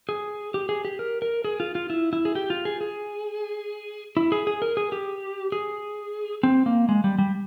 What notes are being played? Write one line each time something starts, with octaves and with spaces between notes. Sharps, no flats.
G#4
G4
G#4
G4
A#4
A#4
G#4
F4
F4
E4
E4
G#4
G4
F4
G#4
G#4
E4
G#4
G#4
A#4
G#4
G4
G#4
C4
A#3
G#3
G3
G3